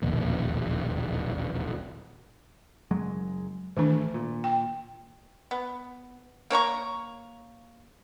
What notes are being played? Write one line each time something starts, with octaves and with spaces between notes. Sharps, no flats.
E1 A#1 D#2
F#1 F#3 G#3
G#1 D#3 E3 A3 D4
A#2
G5
B3
A#3 C#5 A#5 C#6